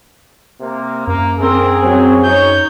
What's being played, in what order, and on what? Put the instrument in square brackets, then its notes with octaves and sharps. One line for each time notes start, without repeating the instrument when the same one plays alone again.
[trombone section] C3 A#3
[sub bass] F#2 [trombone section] A#3
[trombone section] G#2 G#4 [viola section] C4 A#4
[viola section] F#3 [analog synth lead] C4
[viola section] D#4 C#5 [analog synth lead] G6